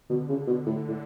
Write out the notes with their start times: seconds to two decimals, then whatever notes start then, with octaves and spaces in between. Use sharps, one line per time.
0.10 B2 D3
0.29 C#3
0.47 B2
0.66 A2
0.88 A2